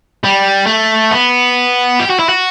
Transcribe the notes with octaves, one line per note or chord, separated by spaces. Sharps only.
G3
A3
B3
G4
F#4
E4
F#4